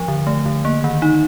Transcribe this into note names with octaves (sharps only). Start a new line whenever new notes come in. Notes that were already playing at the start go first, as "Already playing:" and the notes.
Already playing: F3
D3
A3
D3
A#3
D#3
D#4